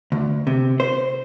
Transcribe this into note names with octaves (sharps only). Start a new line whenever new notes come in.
D2
C3
C5